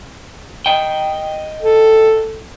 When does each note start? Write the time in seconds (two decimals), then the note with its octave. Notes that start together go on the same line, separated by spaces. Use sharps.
0.66 D#5 G5
1.62 A4